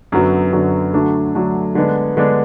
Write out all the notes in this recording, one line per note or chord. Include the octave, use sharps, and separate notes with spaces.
F#2 D3 F#3 B3
F#2 D3 F#3 B3
D3 F#3 A3 D4
D3 F#3 A3 D4
D3 G#3 B3 D4
D3 G#3 B3 D4